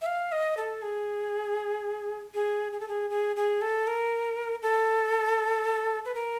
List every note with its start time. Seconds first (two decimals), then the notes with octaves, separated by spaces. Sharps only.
0.01 E5
0.06 F5
0.32 D#5
0.57 A4
0.82 G#4
2.34 G#4
2.72 G#4
2.80 A4
2.88 G#4
3.10 G#4
3.36 G#4
3.61 A4
3.87 A#4
4.62 A4
6.05 B4
6.15 A#4